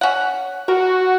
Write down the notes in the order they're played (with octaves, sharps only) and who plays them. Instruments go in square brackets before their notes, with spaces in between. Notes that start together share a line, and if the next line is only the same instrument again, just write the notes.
[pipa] C#4 F#5
[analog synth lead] F#4 [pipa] A#4